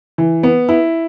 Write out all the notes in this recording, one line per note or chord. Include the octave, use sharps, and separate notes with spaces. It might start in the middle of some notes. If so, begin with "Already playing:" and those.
E3
B3
E4